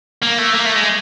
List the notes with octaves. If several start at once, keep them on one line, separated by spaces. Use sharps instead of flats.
A#3
A3
A#3
A3
G#3